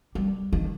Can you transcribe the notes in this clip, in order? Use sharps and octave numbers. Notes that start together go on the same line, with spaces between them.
G3
D#3